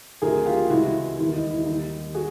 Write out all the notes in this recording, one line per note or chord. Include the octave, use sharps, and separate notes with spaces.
D2 C3 D#3 F#3 G#4 A#4
F4 G4
C#2 C3 E3 G#3 E4 F#4
E1 D#2 D#3 G3 E4
D#4
E4
D#2 D#3 G3 A#3 D#4
F#4 G#4